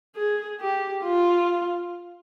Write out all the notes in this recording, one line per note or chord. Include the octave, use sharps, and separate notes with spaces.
G#4
G4
F4